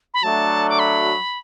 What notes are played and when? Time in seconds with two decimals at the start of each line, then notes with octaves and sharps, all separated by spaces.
0.14 B5
0.23 F#3 A3 D4 A5
0.70 D6
0.79 B5